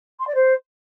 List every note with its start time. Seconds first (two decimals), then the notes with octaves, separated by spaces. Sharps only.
0.20 C6
0.27 D5
0.35 C5